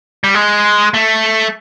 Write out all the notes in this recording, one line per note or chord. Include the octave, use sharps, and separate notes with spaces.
G3
G#3
A3